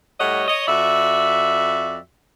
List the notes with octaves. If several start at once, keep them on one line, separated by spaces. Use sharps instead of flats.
A2 G3 C#5 D#5 F#5
C#5 D#5
F2 F#4 D5 E5